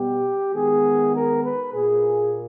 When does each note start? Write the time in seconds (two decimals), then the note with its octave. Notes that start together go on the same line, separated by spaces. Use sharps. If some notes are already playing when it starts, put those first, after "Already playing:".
Already playing: B2 G3 B3 G4
0.52 D#3 G#3 B3 G#4
1.14 A#4
1.43 B4
1.73 A#2 A#3 G#4